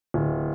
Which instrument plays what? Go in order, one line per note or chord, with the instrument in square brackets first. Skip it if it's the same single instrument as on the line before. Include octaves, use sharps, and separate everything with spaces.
[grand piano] D1